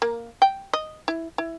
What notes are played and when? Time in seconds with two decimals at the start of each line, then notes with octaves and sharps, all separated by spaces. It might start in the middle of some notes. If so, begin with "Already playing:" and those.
0.02 A#3
0.42 G5
0.73 D#5
1.08 E4
1.38 E4